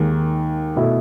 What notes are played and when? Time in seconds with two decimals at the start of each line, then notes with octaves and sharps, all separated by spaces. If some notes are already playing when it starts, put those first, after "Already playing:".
Already playing: D#2 D#3 G#3
0.76 B2 A3 E4